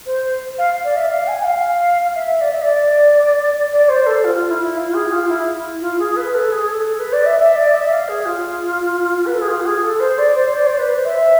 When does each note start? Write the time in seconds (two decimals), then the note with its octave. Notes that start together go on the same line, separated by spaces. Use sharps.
0.05 C5
0.58 F5
0.84 D5
0.96 E5
1.09 F5
1.27 G#5
1.44 F5
2.14 E5
2.40 D5
2.52 E5
2.62 D5
3.72 D5
3.88 C5
4.06 A4
4.24 F4
4.50 E4
4.76 F4
4.93 G#4
5.12 F4
5.28 E4
5.80 F4
5.99 G#4
6.16 B4
6.34 A4
6.51 G#4
6.68 A4
6.86 A4
6.99 B4
7.12 D5
7.25 E5
7.39 E5
7.55 D5
7.73 E5
7.90 F5
8.08 G#4
8.25 F4
9.26 B4
9.33 A4
9.41 G#4
9.48 F4
9.65 G#4
9.83 A4
9.99 C5
10.18 D5
10.35 C5
10.53 D5
10.66 C5
10.78 B4
10.92 C5
11.05 E5